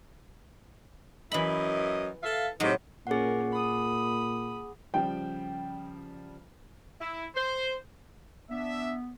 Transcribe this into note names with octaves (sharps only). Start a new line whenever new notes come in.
F#2 E3 E4 D#5 B5
A4 E5 F5
A2 C3 F#3 G#3 D#4
A#2 C#4 G#4 A#4 F#5
B5 D#6
C#3 F3 G3 G5
E4
C5
B3 D4 E5